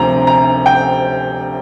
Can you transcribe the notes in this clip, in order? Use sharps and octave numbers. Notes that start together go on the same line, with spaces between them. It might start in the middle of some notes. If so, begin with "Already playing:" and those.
Already playing: D2 C3 F3 C4 A#5
A#5
G5